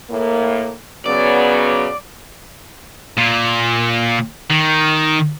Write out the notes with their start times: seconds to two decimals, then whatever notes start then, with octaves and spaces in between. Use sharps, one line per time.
0.10 A2 A#3
1.06 C#3 F#3 B3 D5
3.17 A#2
4.50 D#3